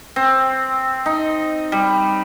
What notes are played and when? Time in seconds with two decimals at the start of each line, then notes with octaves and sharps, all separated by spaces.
0.16 C4
1.06 D#4
1.72 G3